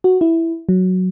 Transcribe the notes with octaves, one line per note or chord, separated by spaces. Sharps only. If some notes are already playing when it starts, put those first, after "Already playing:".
F#4
E4
F#3